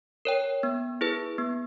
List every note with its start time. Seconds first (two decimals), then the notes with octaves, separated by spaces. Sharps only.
0.25 A#4 C#5 G5
0.63 B3
1.01 E4 G#4 B4
1.38 B3